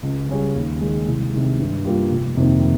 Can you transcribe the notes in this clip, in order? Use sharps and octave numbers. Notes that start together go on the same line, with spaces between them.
C#2
C#3 G3 C#4 G#4
D#2
D#3 G#3
C2
C3 D#3 G#3
G2
G3 A#3 F4
F1
F2 C3 D#3 A#3